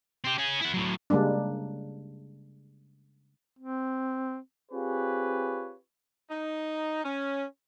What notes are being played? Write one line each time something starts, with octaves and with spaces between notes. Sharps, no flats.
C4 G4
C#4 G#4
E4 F#5
A2 F#3
C#3 G3 G#3 A#3 D4
C4
C4 F4 G4 G#4 B4 C#5
D#4
C#4